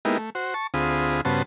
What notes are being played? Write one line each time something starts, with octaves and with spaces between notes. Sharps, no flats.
G#3 A#3 B3 D#4 E4 G4
A3
F#4 C5
A5 C#6
D2 C4 F4 G#4 B5 D#6
G2 C#3 B3 F#4 C5 A5